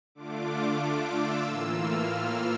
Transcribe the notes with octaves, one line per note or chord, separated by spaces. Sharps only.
D3 A3 D4 F4 D6
E6
A2 E3 A#3 F4
F6
E6